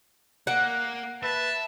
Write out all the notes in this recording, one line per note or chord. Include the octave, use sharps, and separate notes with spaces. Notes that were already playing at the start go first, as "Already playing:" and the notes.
A#3 F#5
B4 E5 A5